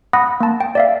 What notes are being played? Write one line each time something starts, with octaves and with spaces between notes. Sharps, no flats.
F#5 B5 D#6 F#6 A#6
A#3 A5
G5
D5 E5 F5